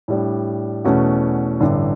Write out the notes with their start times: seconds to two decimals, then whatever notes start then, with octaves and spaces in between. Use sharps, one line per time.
0.08 A2 G3 D4
0.85 E2 B2 A3 C#4 F#4
1.61 A1 G2 D3